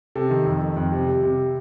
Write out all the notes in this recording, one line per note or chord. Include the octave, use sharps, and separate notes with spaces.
C3 A4
D#3
F2
D#3
F2
C3
G3
C3